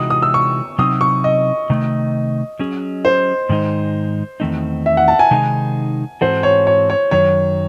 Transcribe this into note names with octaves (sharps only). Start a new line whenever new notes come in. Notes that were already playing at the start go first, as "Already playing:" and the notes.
Already playing: C3 E3 G#3 D#4 F#4 D#6
D#6
E6
C#6
C3 F#3 C4 D#4 D#6
C#6
D#5
C3 D#3 A3
F#3 C#4 G#4
C5
G#2 D#3 G#3 D#4
E2 D#3 A3 C4 D#4
E5
F#5
A5
G#5
C3 D#3 G#3 D#4
G#2 E3 C4 F#4 A4 C5
C#5
C#5
C#5
F#2 D#3 F#3 C#5